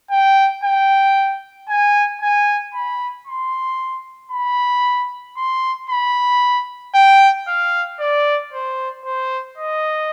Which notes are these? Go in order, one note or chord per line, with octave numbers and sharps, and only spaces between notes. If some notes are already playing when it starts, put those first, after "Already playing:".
G5
G5
G#5
G#5
B5
C6
B5
C6
B5
G5
F5
D5
C5
C5
D#5